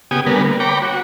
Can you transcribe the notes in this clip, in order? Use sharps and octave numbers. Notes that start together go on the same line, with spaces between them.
C#3 B3 G4 G#5 D#6
D3 G3 B3 A#4 B4
A#3
C#5 G5 A#5 B5 D6
F#4